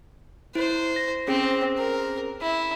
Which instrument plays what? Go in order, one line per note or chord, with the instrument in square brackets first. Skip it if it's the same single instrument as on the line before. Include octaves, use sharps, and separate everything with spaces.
[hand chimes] E4 [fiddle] C5
[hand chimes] A#6
[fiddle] C4 [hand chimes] C#4 G#4 C5
[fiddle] A#4
E4